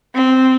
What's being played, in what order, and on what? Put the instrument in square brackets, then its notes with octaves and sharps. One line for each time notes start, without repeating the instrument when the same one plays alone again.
[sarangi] C4